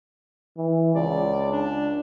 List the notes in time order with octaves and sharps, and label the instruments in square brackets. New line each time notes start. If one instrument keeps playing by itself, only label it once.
[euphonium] E3
[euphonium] C#2 [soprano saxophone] D5
[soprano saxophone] D4